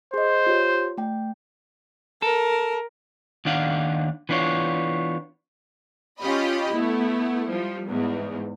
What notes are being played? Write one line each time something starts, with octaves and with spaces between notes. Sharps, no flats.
G#4 C5 D#5
F4 G4 C#5
A3 G5
A4 A#4
D#2 D#3 D4 F5 F#5
E3 B3 D4 F4 C#5
C#4 F4 G4 D#5 B5
A3 B3 E4
F3 G3
E2 G#2